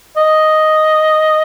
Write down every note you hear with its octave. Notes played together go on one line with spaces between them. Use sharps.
D#5